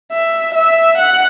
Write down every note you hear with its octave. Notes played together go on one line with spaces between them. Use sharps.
E5
E5
F#5